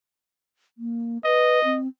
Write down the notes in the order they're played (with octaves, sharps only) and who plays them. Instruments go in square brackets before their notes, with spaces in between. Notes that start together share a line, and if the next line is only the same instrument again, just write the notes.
[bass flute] A#3
[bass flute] B4 [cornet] D#5
[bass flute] C4